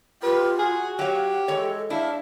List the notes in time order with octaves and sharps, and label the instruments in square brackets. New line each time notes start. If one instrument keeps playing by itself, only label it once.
[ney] F4 [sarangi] G4 [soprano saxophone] B4
[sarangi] F#4 [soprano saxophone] G#4
[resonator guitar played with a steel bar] F#3 C#5 [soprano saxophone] G4 [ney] F5
[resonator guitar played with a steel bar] E3 C#5 [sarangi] G#3 [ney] A4
[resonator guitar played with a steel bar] D4 [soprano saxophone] E4 [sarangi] E5 [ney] F5